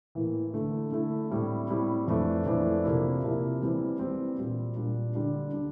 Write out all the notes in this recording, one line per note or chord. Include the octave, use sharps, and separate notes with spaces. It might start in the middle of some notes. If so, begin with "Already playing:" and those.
A2 E3 A#3
D3 A3 E4
D3 A3 E4
A2 G3 C4 E4
A2 G3 C4 E4
F2 E3 A3 D4
F2 E3 A3 D4
C3 F3 A#3 E4
C3 F3 A#3 E4
E3 G3 C4
E3 G3 C4
A#2 G3 D4
A#2 G3 D4
D3 G3 D4
D3 G3 D4